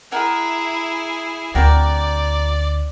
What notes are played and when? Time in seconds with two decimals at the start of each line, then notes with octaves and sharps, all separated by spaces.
0.12 E4 G#4 A#4 F#5 G#5
1.55 D2 C4 F#4 A#4 D5 G5